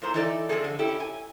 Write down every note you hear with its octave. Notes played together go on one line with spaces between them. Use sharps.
F2 A2 C5 A#5
E3 D#4 E4 A4 C#5 D5
F2 G3 C4 G#4 A4
D3
C#4 E4 G4 A4
G#5